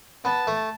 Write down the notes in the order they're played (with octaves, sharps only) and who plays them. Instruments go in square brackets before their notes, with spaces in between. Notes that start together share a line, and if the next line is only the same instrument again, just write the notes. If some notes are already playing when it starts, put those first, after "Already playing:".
[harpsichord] B3 [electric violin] A5
[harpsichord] A3